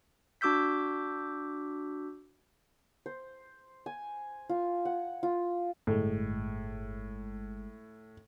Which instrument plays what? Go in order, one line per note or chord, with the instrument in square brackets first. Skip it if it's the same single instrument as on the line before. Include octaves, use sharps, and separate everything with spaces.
[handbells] D4 F#4 D6 E6 G6 B6
[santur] C5
G#5
F4
F#5
F4
[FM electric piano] G1 G#3 [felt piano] A2